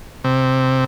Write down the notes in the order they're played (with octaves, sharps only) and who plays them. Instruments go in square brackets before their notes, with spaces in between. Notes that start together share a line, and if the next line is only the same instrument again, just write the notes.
[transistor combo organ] C3